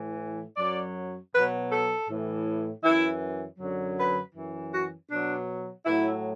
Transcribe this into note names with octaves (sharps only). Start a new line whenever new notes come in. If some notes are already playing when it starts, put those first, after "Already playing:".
Already playing: A2 E3
F#2 F#3 D5
B2 F#3 B4
A4
A2 E3
F#2 E3 E4
F#2 D3 F#3
B4
F#2 E3
F#4
B2 F#3 D4
A2 F#3 E4